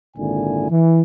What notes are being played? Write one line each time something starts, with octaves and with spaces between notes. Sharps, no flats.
G#1 A#2 D3 E4 G#5
E3